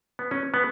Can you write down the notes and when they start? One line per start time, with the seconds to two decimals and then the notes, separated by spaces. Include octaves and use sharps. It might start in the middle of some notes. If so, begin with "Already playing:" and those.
0.19 B3
0.31 C#4
0.54 B3